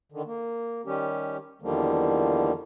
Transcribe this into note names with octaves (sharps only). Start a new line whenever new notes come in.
D3 D#3
A#3
D#3 G3 C#4 G4
E2 D3 D#3 F3 G3 A#3